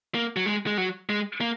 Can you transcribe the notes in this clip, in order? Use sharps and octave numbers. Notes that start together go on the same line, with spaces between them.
A#3
F#3
G#3
G#3
F#3
G#3
A#3